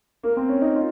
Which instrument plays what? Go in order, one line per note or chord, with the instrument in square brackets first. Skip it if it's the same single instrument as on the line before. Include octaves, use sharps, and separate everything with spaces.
[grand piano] A#3
C4
C#4
D#4
F4